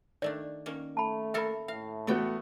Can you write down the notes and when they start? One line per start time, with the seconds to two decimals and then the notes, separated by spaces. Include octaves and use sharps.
0.22 D#3 A3 D4 D5
0.66 D#3 A#3 C#4
0.97 A3 A5 B5
1.34 A#3 A4 E5 F5 B5
1.68 A2 E5 F5
2.07 E3 A3 B3 F#4 D5 G5